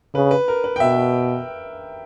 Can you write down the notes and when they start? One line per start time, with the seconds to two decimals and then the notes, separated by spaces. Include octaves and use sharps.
0.14 C#3 B4
0.31 B4
0.48 A#4
0.64 B4
0.76 G5
0.80 B2 E5